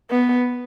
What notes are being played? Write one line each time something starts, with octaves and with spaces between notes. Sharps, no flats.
B3